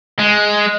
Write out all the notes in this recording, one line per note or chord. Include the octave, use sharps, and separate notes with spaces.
G#3